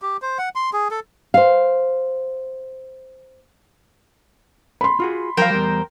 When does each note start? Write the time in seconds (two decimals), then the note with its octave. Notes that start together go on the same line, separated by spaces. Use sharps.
0.02 G4
0.22 C5
0.38 F#5
0.55 C6
0.73 G#4
0.91 A4
1.34 C5 F5
4.81 B5 C6
5.00 F4 F#4 G#4
5.37 F3 F#3 A#4 C5 F5 G5
5.50 E2 G3